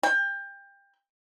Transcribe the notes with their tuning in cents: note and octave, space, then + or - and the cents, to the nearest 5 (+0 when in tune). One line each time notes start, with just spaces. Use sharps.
G5 +25